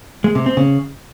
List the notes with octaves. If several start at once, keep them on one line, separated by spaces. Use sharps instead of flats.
G#3
C3
C4
C#3